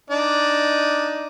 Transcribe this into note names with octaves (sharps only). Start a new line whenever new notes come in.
D4 D#4